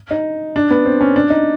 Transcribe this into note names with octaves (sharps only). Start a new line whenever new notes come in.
D#4
D4
B3
C4
C#4
D4
D#4